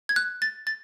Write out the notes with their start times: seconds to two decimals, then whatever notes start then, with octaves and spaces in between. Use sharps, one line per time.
0.09 G#6
0.16 F#6
0.42 A6
0.67 A6